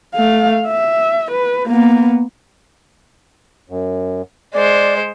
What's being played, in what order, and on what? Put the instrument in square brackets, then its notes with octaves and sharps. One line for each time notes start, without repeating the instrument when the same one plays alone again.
[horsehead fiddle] A3 F5
E5
B4
A#3 B3
[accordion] F#2
[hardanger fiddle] G#3 C5 [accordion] D5